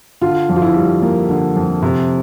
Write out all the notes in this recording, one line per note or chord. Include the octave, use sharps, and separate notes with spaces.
D3 F4
F2
F4
E4
G3
A#3
D3
F2
C3